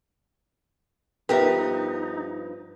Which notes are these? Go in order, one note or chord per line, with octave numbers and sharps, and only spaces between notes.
G2 F3 B3 D#4 G4 A#4 B4 E5